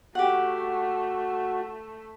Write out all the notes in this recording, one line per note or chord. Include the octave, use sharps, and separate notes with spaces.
A3 F#4 G4 F#5